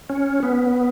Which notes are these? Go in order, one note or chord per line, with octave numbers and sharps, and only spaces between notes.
C#4
B3